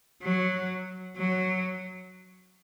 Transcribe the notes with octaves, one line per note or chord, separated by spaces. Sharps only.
F#3
F#3